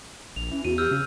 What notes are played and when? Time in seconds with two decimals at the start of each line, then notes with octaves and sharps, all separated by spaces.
0.36 A#1 F7
0.51 E3 C#4
0.65 E2 F#4 D#7
0.78 G4 E6 F6 G6
0.91 C#3